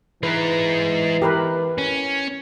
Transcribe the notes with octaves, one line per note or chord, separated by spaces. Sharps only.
E3 G#3 D#4 B4
G4 A#4 B4
C#4